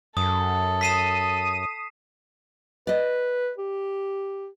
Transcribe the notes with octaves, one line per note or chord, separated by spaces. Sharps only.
F#2 A4 D#6
D#6 B6 C7 D#7 E7
B4 D5 D#5
G4